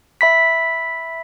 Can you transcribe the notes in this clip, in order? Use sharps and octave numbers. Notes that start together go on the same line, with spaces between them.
E5 B5 B6